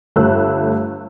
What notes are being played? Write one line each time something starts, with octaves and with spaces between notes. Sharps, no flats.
G1 G3 A3 E6 F#6